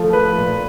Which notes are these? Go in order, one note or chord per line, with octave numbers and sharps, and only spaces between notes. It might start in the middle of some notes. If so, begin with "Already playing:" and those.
Already playing: F3 A3
B4
A#2